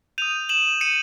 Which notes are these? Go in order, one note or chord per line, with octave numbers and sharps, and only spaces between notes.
D#6 G6 D#7 F7
E7 F#7
C#7 D#7